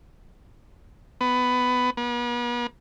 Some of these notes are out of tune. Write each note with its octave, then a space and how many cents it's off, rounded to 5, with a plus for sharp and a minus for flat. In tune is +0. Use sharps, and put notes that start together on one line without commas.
B3 +15
B3 -40